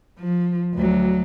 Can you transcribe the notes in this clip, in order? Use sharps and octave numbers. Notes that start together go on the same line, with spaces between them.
F3
D2 F#3